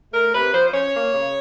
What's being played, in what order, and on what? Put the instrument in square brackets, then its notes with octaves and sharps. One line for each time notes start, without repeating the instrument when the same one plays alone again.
[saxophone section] A3 A#4
C3 B4
F3 C5
C5
C#4 C#5
A#3
C#3